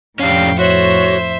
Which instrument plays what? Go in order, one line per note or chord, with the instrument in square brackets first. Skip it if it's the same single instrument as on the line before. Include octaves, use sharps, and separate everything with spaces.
[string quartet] F2 A2 [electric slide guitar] C#4 D4 G4 [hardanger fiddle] F5 G5
[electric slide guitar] F#4 [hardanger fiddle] C5 E5 [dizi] C#5